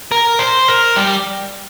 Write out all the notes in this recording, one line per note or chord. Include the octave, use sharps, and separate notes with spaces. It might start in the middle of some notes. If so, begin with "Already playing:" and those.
A#4
C5
A#4
G3